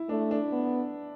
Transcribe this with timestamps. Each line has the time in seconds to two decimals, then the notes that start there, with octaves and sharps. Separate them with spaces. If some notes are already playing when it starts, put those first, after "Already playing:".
Already playing: E4
0.09 A3 D4
0.31 D4
0.52 B3